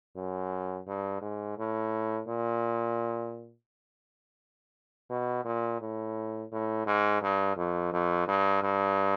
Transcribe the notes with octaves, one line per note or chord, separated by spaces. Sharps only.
F#2
G2
G#2
A2
A#2
B2
A#2
A2
A2
G#2
G2
F2
F2
G2
G2